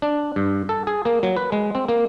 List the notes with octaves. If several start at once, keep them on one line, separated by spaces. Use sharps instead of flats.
D4
G2
A4
G#4
A#3
F#3
B4
G#3
C4
A#3